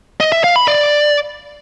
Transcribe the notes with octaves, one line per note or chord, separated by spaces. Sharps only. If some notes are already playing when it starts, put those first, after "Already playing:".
D#5
E5
F5
B5
D5